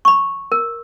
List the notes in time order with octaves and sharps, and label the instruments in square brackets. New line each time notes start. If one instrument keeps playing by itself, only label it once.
[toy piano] B5 C#6
A#4